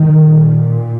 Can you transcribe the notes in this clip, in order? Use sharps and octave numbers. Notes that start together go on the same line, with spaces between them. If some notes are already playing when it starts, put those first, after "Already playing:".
Already playing: D#3
A#2